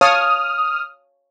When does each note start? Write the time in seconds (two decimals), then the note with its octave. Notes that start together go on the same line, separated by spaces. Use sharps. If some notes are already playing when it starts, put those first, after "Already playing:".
0.01 C#5 F5 A5 D#6 F6